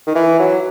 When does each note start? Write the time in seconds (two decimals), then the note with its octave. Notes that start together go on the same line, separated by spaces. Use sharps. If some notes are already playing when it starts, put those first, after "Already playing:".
0.07 D#3
0.15 E3
0.39 F#3